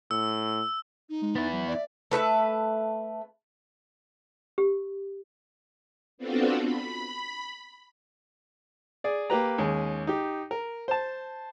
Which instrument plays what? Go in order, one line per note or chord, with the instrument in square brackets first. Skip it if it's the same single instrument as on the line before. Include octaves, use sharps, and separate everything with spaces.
[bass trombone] A2 [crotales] E6
[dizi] D#4
[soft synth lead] G#3
[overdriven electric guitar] B3 E4 [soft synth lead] A6
[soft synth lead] F#3
[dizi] D5 [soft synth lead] E5
[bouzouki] A3 B4 D#5 E5
[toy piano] G4
[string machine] B3 C4 D4 F4 F#4 A4
B5
[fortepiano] G#4 D5
A#3 G4 B4 A#5
D#2 G#3 C#4
D#4 G4
A#4
C5 A5